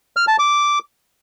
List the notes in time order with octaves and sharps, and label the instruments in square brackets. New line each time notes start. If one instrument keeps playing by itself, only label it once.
[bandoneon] F6
A5
D6